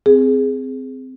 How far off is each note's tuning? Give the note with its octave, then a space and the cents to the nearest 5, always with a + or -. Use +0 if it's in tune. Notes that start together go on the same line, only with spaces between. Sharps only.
C4 -15 G#4 +0